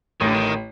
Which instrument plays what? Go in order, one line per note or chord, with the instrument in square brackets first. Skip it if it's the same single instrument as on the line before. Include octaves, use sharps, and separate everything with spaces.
[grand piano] A1 [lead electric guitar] D#3
[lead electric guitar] D3
D#3